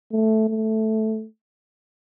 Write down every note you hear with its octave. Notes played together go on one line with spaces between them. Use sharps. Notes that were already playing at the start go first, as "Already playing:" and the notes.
A3
A3